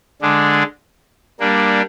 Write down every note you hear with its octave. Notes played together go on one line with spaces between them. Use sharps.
D3 G#3 D4
G3 A#3 D4